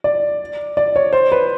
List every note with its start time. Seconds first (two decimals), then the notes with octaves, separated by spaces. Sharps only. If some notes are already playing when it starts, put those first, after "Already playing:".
0.04 D5
0.77 D5
0.96 C#5
1.13 C5
1.32 B4